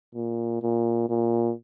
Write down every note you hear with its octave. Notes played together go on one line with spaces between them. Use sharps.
A#2
A#2
A#2